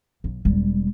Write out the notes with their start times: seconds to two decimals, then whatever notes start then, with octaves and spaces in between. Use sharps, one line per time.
0.24 B1
0.45 E1 G3